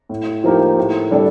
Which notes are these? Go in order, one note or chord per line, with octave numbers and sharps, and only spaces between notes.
A2
F3 A#3 D#4 G4
A2
G3 D4 A4 D5